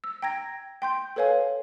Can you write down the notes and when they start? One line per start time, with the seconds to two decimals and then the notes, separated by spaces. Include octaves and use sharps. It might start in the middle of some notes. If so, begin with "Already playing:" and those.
0.04 E6
0.22 G5 A#5 G#6 A#6
0.82 G5 C6 G6
1.16 A4 B4 C#5 F5 G#5